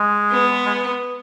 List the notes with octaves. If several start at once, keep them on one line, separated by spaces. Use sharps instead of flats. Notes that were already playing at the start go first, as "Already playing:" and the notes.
Already playing: G#3
B3
G#3